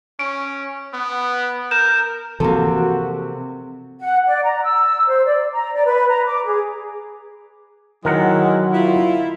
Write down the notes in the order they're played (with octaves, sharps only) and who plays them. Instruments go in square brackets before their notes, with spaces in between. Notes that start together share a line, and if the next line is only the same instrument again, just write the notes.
[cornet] C#4 [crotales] D7
[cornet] B3
[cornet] A#4 [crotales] G6 E7
[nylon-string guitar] C3 A#3 [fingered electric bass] E3 F3 [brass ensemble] F#4 [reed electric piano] A4
[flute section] F#5
D5
A#5
E6
C5
D5
A#5
D5
B4
A#5
D6
G#4
[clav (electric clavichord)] D#3 A#4 F#5 [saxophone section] E3 G#3 E4 [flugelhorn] F#3
[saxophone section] E4 [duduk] F4